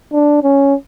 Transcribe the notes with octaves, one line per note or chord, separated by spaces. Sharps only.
D4
C#4